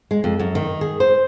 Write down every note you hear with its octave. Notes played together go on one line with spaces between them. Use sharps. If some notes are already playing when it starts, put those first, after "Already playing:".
G#3
F2
F#2
D#3
G#4
C5